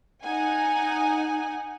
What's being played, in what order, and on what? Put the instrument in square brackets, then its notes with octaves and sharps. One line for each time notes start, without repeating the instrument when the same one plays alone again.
[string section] D#4 F#5 G#5